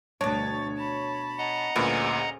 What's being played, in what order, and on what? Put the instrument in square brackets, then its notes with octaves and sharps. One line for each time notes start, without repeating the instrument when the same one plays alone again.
[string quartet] D2 A6 [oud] B2 D4 [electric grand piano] C#5
[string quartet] A5 B5
[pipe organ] D#5 F#5 A#5
[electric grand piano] D2 A#2 [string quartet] C#4 G#4 C5 [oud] B4